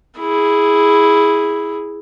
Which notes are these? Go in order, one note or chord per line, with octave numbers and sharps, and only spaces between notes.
E4 G#4